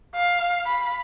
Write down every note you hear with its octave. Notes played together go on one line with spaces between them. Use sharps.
F5
B5